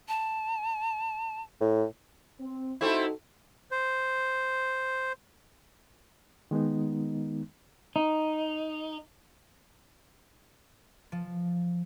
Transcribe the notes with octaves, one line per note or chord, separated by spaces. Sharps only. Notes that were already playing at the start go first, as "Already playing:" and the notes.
A5
A2
C4
A3 C4 D#4 E4 F#4 A4
C5
D#3 G#3 B3 D#4
D#4
F3